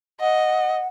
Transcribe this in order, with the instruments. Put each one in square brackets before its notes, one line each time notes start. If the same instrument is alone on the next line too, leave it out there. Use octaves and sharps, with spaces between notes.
[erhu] D#5 [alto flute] F#5